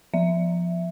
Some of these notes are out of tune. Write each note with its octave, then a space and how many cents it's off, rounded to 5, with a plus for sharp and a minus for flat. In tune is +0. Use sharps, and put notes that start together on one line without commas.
F3 +0 E5 +0